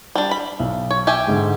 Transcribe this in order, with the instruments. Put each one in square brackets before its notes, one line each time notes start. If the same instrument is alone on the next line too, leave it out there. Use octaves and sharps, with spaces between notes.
[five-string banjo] G3 D4
B5
[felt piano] B1
[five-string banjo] C#5
G4 E5 G#5
[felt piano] G#2 D3 G#3